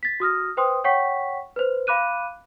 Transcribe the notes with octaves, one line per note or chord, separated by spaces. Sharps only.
A6 B6
F#4 D#6 F6 A#6
B4 C5 G5 C6 D#6
C#5 F#5 G5 C#6 B6
B4 C5
F5 B5 D6 F#6 D#7